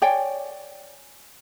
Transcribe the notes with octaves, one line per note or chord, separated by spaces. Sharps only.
C#5 D5 G5 G#5